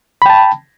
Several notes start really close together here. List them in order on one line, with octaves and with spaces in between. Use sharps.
B5 G5 A5